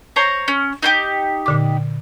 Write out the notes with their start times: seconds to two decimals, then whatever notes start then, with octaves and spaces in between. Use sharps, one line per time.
0.16 C5 C#5 A#5
0.48 C#4
0.82 D#4 F4 G4
1.46 A#2 D3 D6